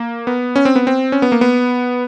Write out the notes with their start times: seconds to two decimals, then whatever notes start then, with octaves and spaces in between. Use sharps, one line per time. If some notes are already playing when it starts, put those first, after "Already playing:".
Already playing: A#3
0.27 B3
0.56 C#4
0.65 C4
0.76 B3
0.87 C4
1.12 C#4
1.22 B3
1.32 A#3
1.41 B3